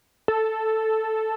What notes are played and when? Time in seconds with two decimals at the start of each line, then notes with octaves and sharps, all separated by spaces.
0.28 A4